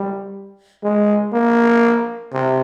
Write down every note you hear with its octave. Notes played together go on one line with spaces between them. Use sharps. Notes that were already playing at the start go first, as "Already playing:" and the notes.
Already playing: G3
G#3
A#3
C3